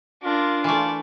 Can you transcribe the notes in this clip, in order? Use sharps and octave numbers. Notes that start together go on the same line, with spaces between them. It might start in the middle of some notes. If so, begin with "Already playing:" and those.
D4 F4 A#4
E3 A3 D5